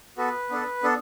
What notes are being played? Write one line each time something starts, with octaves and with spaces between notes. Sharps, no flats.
B3 F#4 A4 B4
B3 D4 A4
B3 D4 A4